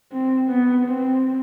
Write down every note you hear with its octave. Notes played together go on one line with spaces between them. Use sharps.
C4
B3
C4